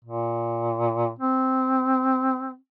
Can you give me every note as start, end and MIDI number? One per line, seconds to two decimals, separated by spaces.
0.04 1.12 46
1.19 2.56 60